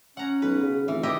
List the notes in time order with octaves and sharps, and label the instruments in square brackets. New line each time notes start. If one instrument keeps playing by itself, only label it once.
[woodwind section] C#4 [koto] F#5 A#5
[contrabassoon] B1 [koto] B4
[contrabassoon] C#3
[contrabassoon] F1 [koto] E3
[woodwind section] A#2 E3 [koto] E4 G4 D#5